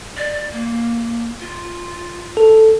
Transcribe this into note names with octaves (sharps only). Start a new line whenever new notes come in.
D5
A#3
F4
A4